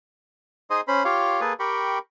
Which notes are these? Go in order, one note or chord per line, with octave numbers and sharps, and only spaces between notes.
D#4 G#4 C5 D#5 C6 D#6
C#4 C5 B5
F4 G4 C#5 F5
A#3 G#4 A4 B4
G4 A#4 G5 B5 C#6